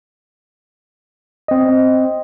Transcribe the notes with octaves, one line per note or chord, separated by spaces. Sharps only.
C4 D#5